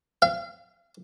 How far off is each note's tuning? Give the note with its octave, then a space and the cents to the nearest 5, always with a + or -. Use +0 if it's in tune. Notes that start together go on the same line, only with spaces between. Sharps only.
F5 -40